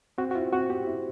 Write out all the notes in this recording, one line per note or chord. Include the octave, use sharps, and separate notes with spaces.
C4 F#4
F#4
E4 F4
C4 F#4
C4 G4
E4